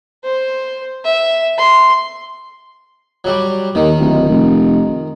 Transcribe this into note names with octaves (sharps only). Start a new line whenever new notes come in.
C5
E5
C6
F#3 G3
D#2 D#3
D1
F1